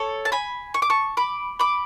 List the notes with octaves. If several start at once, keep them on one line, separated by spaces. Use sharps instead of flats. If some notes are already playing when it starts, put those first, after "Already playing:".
Already playing: A4 C#5
A5
G#5 B5
C#6
D6
A5 C#6
B5 D6
B5 D6